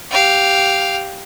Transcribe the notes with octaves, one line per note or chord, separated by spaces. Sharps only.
G4 F5